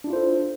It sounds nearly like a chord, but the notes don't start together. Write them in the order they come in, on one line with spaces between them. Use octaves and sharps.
D4 E4 F4 C5 A4